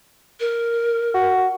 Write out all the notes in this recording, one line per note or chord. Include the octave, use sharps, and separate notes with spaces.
A#4
F#4